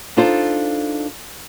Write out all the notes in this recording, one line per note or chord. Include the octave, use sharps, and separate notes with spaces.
D4 D#4 F4 A4 C5